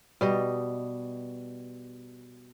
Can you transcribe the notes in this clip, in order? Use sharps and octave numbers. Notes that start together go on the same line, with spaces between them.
B2 G3 D#5